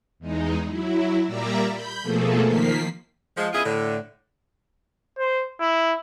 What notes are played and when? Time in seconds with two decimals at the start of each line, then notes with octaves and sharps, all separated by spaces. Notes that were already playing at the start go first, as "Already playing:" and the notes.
0.19 E2 G#3 D#4
0.67 F#3 E4
1.26 A#2 G3 A#3 D5 E5 A#5
1.69 B5 G6
2.02 B2 F3 A3 A#3 G#4 A4
2.45 D#3 F3 A#3 B6 C7
3.36 F3 G#3
3.53 C#3 B3 E4 F4 G#4 D#5
3.64 A2 D3
5.18 C5
5.61 E4